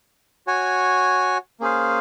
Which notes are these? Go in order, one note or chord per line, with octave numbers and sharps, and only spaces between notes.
F#4 C#5 G#5
A#3 C#4 G#4 C5 F5